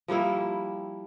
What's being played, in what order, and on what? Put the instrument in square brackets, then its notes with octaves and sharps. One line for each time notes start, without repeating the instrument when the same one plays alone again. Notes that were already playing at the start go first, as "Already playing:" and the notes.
[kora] F3 G3 A#3 E4